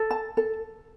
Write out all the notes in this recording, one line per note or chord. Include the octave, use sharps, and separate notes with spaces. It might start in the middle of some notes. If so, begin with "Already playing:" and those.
Already playing: A4
A5
A4